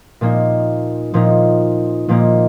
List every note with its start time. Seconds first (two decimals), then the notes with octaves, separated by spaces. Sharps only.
0.21 A#2 F3 A#3 D#4
1.14 A#2 F3 A#3 D#4
2.09 A#2 F3 A#3 D#4